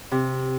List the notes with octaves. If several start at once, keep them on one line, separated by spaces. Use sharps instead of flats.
C3